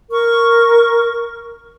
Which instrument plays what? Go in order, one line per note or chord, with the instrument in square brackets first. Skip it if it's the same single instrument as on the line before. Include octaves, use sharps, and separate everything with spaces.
[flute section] A#4 C#6